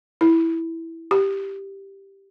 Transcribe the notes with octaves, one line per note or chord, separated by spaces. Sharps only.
E4
G4